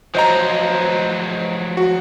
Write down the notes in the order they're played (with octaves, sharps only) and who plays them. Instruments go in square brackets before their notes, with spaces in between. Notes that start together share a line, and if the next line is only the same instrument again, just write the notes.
[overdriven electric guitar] F3 F#3 [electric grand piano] C5 D#5 A#5
[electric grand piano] F#4